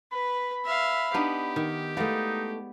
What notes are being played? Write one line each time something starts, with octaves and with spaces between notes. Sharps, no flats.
B4 B5
E5 F5
B3 D4 D#4 G4
D#3
G#3 A3 B3 D#4 E4 D5 F5